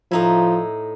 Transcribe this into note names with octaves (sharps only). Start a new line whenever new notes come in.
A2 F3 D#4 E4